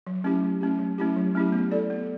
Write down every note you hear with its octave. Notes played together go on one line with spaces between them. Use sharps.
F#3
A3 C#4 E4 G4
F#3
A3 C#4 E4 G4
F#3
A3 C#4 E4 G4
F#3
A3 C#4 E4 G4
B3
E4 A4 D5
B3